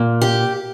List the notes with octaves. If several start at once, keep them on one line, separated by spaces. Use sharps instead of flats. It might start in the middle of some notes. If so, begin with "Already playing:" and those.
Already playing: A#2
G4